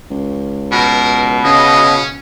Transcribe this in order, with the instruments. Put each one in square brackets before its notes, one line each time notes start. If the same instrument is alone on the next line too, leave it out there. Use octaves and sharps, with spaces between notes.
[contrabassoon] C#2
[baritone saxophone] B2 [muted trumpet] A#4
[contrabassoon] C#3 [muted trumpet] C#4 [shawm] D#5